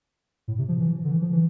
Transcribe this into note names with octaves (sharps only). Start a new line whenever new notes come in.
A2
C3
F3
E3
D3
E3
F3
E3